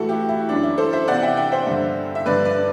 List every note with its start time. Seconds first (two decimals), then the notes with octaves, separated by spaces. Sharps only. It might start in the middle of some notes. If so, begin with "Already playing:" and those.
Already playing: A2 E3 F#4 A4
0.09 E4 G4
0.29 E4
0.49 F#2 E3 D4
0.63 E4
0.78 A4 C5
0.93 C5 E5
1.08 E2 C3 E3 D5 F#5
1.22 E5 G5
1.37 E5 G5
1.52 C5 E5
1.67 G2 D3
2.15 E5
2.26 G2 D3 B4 D5
2.45 B4 D5